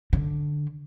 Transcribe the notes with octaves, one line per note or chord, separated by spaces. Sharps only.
D3